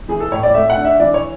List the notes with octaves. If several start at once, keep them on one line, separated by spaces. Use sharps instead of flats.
E3 G#4
A4
A2 C#5
D5
A3 E5
F#5
D4
E5
E3 D5
C#5